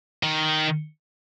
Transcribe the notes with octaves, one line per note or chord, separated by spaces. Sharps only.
D#3